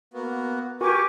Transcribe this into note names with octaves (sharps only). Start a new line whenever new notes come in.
A#3 B3 F#4
F#4 G4 A#4 B4 G#5 C#6 D6